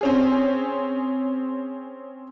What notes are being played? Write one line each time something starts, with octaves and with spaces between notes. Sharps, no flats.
C4 C#4 G#4